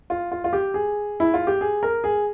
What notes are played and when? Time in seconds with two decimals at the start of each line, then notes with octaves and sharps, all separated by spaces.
0.10 F4
0.31 F4
0.44 F4
0.53 G4
0.74 G#4
1.20 E4
1.34 F4
1.47 G4
1.61 G#4
1.83 A#4
2.04 G#4